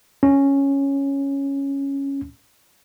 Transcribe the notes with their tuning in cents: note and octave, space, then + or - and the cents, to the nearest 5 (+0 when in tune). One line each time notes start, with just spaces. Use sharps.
C#4 +0